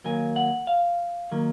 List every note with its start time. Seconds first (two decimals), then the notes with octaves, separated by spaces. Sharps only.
0.04 D#3 F#3 A#3 G#5
0.36 F#5
0.67 F5
1.31 D#3 F#3 A#3